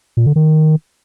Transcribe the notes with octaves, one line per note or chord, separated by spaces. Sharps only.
A#2
D3
D#3